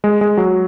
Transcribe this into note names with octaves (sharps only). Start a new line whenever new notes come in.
G#3
G#3
F#3